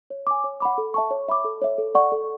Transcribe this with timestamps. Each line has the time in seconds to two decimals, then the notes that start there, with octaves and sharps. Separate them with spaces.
0.10 C#5
0.27 G#5 D6
0.44 C#5
0.60 F#5 B5 D6
0.78 A4
0.94 E5 A5 C#6
1.11 C#5
1.28 E5 B5 D6
1.44 A4
1.62 C#5 E5
1.78 A4
1.95 D5 F#5 C#6
2.12 A4